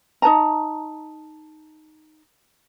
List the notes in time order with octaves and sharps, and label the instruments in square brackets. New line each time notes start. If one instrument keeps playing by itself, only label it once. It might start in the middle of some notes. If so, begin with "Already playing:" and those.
[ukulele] D#4 B4 A5 A#5